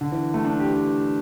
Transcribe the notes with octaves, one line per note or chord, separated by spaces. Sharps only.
D3
E3
A3
D4
G4
G4